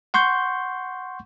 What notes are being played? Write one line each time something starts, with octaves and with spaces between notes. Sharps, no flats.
F#5 C6 C#6 G6